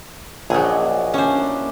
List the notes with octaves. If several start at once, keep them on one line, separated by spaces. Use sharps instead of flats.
A#1 F#3 G#4 F#5
C#4 D5 D#5
D3 C#4 D4 E4 C5
A3 A#3